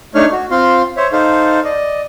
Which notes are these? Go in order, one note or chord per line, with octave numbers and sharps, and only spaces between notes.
A3 D4 D#4 C#5 F6
F#4
C4 F4 F5 C6
C5 C#5 E5
D#4 A4 C5 F5
D5 D#5